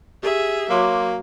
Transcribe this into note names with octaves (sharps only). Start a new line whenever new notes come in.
G4 G#4 E5
F#3 A#3 C#5 C6 D6